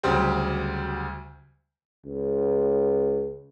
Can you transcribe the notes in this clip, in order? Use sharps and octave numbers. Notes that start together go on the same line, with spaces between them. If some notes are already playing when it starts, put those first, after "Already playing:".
D2 C#3 F#3 G3 G4 C5
C#2